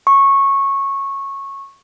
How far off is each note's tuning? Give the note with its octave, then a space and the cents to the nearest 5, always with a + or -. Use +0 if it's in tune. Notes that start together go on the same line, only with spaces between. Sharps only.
C#6 -15